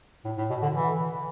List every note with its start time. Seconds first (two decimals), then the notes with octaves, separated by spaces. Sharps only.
0.25 A2
0.38 A2
0.50 B2
0.63 D3
0.75 E3